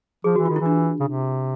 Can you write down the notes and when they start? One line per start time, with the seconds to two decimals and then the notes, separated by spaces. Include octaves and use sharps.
0.24 F3 G#4
0.36 E3 F#4
0.46 D#3 F4
0.56 E4
0.60 E3
0.66 D4
1.00 C#3
1.08 C3